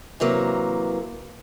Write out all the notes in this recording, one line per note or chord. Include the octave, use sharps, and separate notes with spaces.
C3 E3 F#3 A#3